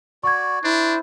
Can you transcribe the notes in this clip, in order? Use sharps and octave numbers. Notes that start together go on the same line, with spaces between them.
F#4 D5 C#6 G#6
D4 E4 C5